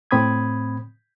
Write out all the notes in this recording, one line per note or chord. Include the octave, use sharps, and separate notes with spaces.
A2 C4 B5 D#6 G#6